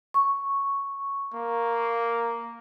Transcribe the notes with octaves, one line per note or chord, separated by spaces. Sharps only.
C#6
A#3